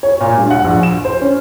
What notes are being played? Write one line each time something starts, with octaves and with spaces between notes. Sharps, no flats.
C#5
A#2
G2
F#5
A#1
E7
C5
C#4